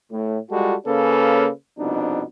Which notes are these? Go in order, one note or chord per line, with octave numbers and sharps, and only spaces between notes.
A2
G3 G#3 F4 F#4 A4
C#3 A#3 C#4 A4 B4
C2 F2 B2 D4 D#4